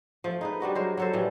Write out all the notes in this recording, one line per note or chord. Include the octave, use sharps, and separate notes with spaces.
F3 A3
D#4 G#4 B4
G3 D4 F#4 D#5
F#3 G#3 A#4 C5
F#3 A4 C5
A2 E3 F3 G3